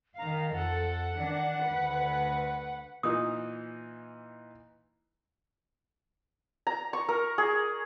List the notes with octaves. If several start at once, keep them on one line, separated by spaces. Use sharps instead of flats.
D#3 F5 A#5
F2 A4 F#5
D#3 E3 D4
D2 B4
A#2 E3 D#4 D#6
A#5
C#6
A#4
G#4